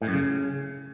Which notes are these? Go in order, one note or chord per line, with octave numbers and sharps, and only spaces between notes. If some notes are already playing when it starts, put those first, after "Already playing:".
A2
F#2
C#3